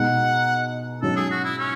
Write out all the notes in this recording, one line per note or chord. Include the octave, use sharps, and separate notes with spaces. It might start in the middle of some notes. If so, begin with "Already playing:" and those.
Already playing: B2 G#3 D#4 F#5
G#2 F#3 C#4 A4
G#4
F#4
E4
C#4